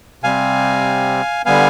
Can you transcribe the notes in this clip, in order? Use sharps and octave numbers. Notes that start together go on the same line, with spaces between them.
C3 G3 C4 F5 G#5
D3 G3 B3 F5 G#5